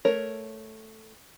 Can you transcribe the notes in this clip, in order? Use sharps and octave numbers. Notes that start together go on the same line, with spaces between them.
A3 A#4 C#5